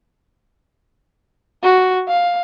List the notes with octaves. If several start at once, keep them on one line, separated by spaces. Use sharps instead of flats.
F#4
F5